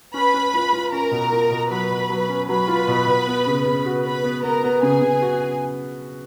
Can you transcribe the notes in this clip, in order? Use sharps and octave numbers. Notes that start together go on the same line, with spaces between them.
C#4 B4 B5
C#4
F4
F4
C#4 A#4 A#5
B2
F4
B2
F#3 B4 B5
B2
F#3
C#4
F#3 B4 B5
F4
B2
B2
B3
C#3
C#3
F#4
B3 B4 B5
B3
B3 A#4 A#5
B3
C#3 G#4 G#5
C#3
F#4